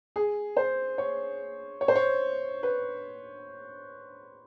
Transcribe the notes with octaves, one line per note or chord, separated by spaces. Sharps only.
G#4
C5
C#5
C#5
C5
C#5
B4